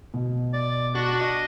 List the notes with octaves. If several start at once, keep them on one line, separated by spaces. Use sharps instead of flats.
B2
D5
D4 F#4
D#5